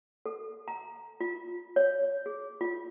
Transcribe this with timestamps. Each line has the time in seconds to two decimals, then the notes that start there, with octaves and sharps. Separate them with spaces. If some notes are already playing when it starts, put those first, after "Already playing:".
0.26 A4
0.68 A#5
1.21 F4
1.76 C#5
2.26 G#4
2.61 F4